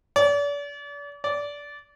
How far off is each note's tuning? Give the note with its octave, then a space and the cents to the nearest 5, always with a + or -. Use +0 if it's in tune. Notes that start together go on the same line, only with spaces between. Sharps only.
D5 -40
D5 -20